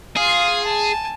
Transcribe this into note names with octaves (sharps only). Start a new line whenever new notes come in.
F4 G#4 F5
G#5 A5